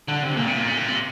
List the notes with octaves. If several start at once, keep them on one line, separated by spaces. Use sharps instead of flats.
D3
C3
A#2
C3
A#2
C3
A#2
C3